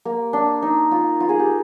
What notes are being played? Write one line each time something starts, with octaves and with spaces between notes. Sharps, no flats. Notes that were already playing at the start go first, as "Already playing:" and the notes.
A#3
D4
D#4
F4
F4
G#4
G4